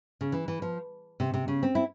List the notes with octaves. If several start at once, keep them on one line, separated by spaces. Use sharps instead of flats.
C#3
E3
E3
F3
C3
C3
C#3
C4
E4